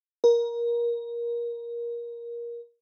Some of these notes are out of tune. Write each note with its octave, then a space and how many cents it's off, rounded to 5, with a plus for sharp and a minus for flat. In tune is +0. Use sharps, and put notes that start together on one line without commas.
A#4 +20